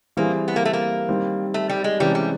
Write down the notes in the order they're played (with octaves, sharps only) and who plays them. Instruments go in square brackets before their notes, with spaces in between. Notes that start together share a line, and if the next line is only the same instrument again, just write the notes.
[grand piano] E3 G3 C4 E4 G#4 [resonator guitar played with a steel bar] A#3
[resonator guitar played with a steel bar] B3
A#3
A3
A#3
[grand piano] D#3 G3 C4
[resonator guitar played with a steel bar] A3
G3
G#3
[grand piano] C3 E3 G#3 C#4 [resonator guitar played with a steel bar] G3
[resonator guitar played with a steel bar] G3